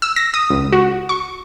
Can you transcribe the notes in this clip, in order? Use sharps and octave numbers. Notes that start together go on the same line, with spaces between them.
E6
A#6
D#6
C#2
F#4
C#6